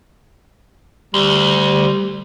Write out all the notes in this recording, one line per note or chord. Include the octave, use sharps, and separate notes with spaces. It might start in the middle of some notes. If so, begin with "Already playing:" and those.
D2 G3